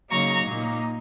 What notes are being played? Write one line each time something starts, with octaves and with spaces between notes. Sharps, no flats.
C#3 F#3 A#3 D#4 A#5 C#6
A#2 A#3 D#4